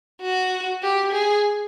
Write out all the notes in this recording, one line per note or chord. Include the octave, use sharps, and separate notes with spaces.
F#4
G4
G#4